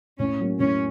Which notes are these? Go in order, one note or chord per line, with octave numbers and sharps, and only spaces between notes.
A2 C#4
F#3 A#3
A2 C#4